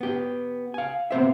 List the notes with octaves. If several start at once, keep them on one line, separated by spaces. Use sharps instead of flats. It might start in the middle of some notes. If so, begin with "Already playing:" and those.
B3 G4
F5 G#5
B3 C4 C5 E5